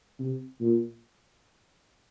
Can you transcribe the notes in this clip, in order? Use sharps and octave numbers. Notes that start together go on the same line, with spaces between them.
C3
A#2